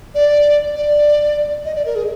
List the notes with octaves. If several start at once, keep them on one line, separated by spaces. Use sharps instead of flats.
D5
D5
D#5
D5
A#4
G#4